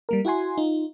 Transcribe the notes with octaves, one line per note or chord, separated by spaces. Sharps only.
G3 A#3 A#4
E4 F#4 F#5 G#5 C6
D#4 F4